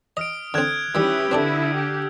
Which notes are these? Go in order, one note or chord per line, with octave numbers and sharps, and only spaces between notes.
D#5 D#6 F6 D7
D3 C4 F6 F#6 G#6
D#3 G3 C#4 E4 G4 B4 E6
D3 C4 D4 E4 A4
G4